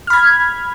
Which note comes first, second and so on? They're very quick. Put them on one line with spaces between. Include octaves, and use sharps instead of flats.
F6 B5 G#6